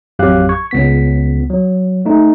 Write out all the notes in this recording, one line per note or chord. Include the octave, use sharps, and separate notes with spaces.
A1 F2 F#3 G4 F5 F#6
C#6 G#6
C#2 B3 B6
F#3
A3 D#4